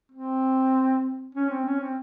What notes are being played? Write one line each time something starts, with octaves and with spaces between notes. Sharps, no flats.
C4
C#4
C4
C#4
C4